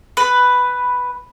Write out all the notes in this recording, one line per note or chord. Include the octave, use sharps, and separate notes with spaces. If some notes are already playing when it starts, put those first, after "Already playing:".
B4